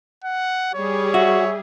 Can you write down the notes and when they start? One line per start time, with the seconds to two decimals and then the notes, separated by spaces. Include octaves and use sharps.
0.24 F#5
0.74 G3 G#4 C#5
1.14 F#4 E5